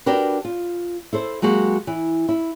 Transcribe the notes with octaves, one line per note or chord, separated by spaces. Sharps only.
D4 F#4 G4 A#4 B4
F4
E4 A4 C5
F#3 G#3 A#3 F#4 G4
E3
E4